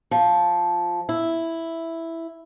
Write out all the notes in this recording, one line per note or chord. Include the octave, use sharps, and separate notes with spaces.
F3
E4